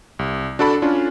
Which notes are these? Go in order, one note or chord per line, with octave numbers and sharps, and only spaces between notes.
C2
D4 F#4 A4 D5 B5
C#4 D4 F4